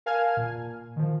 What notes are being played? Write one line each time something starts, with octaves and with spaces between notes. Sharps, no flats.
A#4 F5 G#5 A5 F6 G#6
A#2
D#3 F3